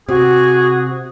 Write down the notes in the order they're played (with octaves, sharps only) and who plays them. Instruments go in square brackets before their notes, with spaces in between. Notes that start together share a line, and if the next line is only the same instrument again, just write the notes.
[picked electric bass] C3 [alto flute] F#4 [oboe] G#4